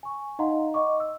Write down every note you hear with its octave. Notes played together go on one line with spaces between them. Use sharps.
G#5 C#6
D#4 D#5 F5 F#5 A#5 C6
D#5 F#5 C#6 D6
E6